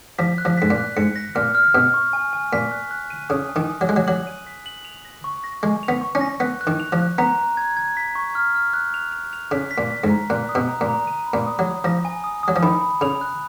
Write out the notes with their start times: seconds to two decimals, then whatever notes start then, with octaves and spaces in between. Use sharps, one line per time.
0.18 F3 B6
0.38 F#6
0.45 F3
0.57 G#2 B6
0.70 A#2
0.78 F#6
0.97 G#2 C#7
1.16 A#6
1.35 A#2 F6
1.55 F6
1.74 B2 F6
1.94 C#6
2.13 G#5
2.33 G#5
2.53 A#2 B6
2.71 F#6
2.91 F#6
3.10 D#7
3.29 C#3 D#6
3.49 G#5
3.56 D#3
3.68 D#6
3.81 F#3
3.88 G#3 F#6
3.96 F#3
4.07 F#3 F#7
4.27 D#7
4.47 B6
4.66 F#7
4.85 F7
5.05 A#6
5.24 C#6
5.44 A#6
5.63 G#3 C#6
5.83 F7
5.88 B3
6.01 C#6
6.15 C#4
6.21 A#6
6.40 B3 F#6
6.61 F#6
6.67 D#3
6.80 F7
6.92 F3
6.99 F#6
7.18 B3 A#5
7.38 A#5
7.57 G#6
7.77 G#6
7.97 B6
8.15 C#6
8.35 F6
8.55 F6
8.73 F#6
8.94 F7
9.12 F7
9.33 F7
9.51 C#3 B6
9.71 B6
9.78 A#2
9.91 B6
10.04 G#2
10.10 A#5
10.30 A#2 F#6
10.49 D#6
10.55 B2
10.68 A#5
10.81 A#2
10.88 A#5
11.07 D#7
11.27 B5
11.34 A#2
11.47 D#6
11.59 F#3
11.66 D#6
11.84 F3 A#6
12.05 G#5
12.24 D#6
12.43 F#3 D#6
12.56 F3
12.62 D#3 B5
12.82 B5
13.01 C#3 F7
13.21 F#6